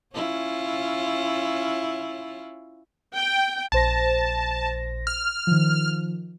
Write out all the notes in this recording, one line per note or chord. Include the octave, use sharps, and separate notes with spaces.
C#4 E4 F4
G5
A#1 C5 A5 A#6
F6
D#3 F3